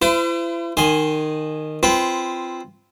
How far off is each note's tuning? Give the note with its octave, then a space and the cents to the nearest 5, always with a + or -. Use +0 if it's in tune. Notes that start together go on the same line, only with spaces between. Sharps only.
E4 +40 C5 -40
D#3 -15 G#5 +0 C6 +0
C4 +0 F4 -15 B4 +0